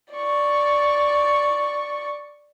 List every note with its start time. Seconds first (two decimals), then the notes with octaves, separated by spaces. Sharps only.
0.14 D5 C#6